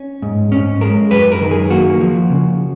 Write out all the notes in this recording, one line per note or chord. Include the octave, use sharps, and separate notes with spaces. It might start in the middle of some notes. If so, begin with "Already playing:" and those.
Already playing: C#4
G#2
G#2 C#4
G#3 A#4
F#2 B4
A#4
D#3
G#4
A#3 F#4
F3
C#3